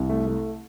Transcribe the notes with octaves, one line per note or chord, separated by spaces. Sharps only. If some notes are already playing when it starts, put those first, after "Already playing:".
Already playing: C2
A3
A3